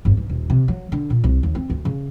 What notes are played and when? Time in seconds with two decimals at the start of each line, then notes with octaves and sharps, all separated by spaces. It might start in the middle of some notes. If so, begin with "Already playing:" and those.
0.05 G1
0.17 B1
0.29 D#1
0.50 C3
0.68 F#3
0.92 D3
1.10 A#2
1.24 C2
1.43 D#2
1.55 C4
1.70 D2
1.85 C#3